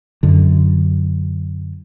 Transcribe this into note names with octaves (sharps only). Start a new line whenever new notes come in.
F#2 D3